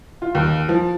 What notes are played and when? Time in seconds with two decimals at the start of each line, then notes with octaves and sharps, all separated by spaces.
0.22 F4
0.35 D#2
0.69 F3